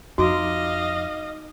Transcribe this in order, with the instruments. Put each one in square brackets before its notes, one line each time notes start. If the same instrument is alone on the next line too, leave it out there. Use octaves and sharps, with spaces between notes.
[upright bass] F2 [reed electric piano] D#4 D6 [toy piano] F#4 [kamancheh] D#5 F5